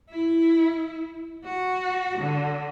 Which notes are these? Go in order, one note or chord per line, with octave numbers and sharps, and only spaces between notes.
E4
F#4
D3